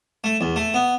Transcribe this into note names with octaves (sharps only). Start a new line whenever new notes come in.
A3
E2
A3
B3